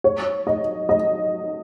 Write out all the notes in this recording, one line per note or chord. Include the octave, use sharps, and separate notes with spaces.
C#5
D#5
D#5